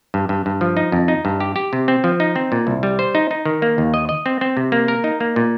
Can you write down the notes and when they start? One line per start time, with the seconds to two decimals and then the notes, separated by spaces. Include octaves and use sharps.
0.14 G2
0.29 G2
0.46 G2
0.61 F3
0.77 D#4
0.92 F2
1.08 D#4
1.25 G2
1.40 G4
1.56 G4
1.73 C3
1.88 C4
2.04 F3
2.20 D#4
2.36 C4
2.52 A#2
2.67 C2
2.83 G3
2.99 C5
3.15 D#4
3.31 D#4
3.45 D#3
3.62 A#3
3.78 D#2
3.94 D#5
4.09 D#5
4.26 C4
4.41 C4
4.57 C3
4.72 A#3
4.88 A#4
5.04 D#4
5.20 A#3
5.36 A#2